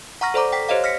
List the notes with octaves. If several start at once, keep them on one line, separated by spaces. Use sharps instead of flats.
F#5 A#5 C#6 F6 A#6
A4 C5 D5 A#5 D6
G5 B6
G4 C5 C#5 D#5 F5
F6 A#6 B6 C#7